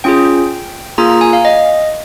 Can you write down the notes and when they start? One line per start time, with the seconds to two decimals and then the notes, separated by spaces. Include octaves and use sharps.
0.04 C#4 F4 G#4 G5
0.98 A#3 F4 G#4 A#5
1.10 A#5
1.21 G#5
1.33 F5
1.45 D#5